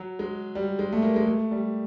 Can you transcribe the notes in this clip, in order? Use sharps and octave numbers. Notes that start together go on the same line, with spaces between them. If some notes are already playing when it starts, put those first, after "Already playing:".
Already playing: F#3
G#3
G3
G#3
A3
A#3
G#3
A3
G3